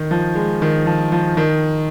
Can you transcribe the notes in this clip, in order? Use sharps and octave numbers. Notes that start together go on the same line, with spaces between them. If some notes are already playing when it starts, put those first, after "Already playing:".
Already playing: D#3
F3
G#3
D#3
F3
F3
D#3